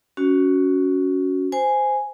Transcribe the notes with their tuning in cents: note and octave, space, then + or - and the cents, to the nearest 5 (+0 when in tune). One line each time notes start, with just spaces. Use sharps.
C#4 +15 F#4 +0
C5 -15 G#5 +0